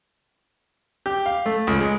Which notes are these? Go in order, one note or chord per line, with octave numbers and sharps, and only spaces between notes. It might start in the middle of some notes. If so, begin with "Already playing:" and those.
G4
F5
A3
C#2
G#3